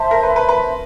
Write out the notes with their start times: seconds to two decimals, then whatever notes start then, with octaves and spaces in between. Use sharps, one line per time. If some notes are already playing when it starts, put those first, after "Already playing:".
Already playing: C5 E5 A5 C6
0.11 A#4
0.23 B4
0.36 B4
0.49 B4